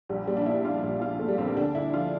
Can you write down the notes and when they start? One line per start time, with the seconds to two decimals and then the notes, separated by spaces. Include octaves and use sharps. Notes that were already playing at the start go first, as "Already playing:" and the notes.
0.09 A#1 G3
0.27 A#2 G3
0.37 D4
0.46 A#2 E4
0.65 A#2 F4
0.83 A#1
1.01 A#2 F4
1.19 A#2 A3
1.28 G3
1.38 A#1 C4
1.47 A#3
1.57 D2 D4
1.75 D2 E4
1.93 F3 F4